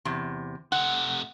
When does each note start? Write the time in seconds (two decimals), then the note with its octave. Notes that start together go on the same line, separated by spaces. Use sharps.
0.05 E2 C3
0.72 C3 A3 F#5